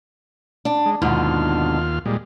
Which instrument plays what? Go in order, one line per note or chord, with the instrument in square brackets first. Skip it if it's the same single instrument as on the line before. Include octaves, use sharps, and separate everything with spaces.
[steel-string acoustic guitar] D4
[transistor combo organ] G#3
[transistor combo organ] D#2 F4 F6 [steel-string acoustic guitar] G#2 B2 D3
[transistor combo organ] A#2 G3 G#3